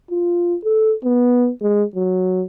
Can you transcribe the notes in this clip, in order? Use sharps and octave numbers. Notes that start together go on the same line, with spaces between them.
F4
A4
B3
G#3
F#3